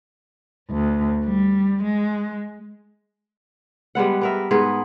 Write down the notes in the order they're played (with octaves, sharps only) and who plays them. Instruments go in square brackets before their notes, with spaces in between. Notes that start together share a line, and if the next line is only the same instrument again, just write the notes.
[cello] D2
G3
G#3
[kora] G3 G#3 B3 F#5
B3 A#4 E5
G#2 B3 G#4 A#4